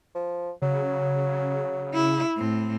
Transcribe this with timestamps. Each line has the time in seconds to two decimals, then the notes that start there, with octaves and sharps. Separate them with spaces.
0.15 F3
0.62 C#3 F#3
1.94 E4
2.37 A2 C4